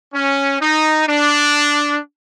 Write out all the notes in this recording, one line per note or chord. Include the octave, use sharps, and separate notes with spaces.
C#4
D#4
D4